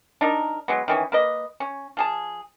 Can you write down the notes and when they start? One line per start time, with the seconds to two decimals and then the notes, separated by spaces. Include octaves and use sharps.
0.21 D4 D#4 A#4
0.68 F#3 G#3 B3
0.88 D#3 E3 C#4
1.12 A#3 B4 D#5
1.60 C#4
1.97 F3 G#4 A5